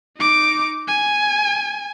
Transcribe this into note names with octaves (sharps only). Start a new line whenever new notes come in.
D#4 D6
G#5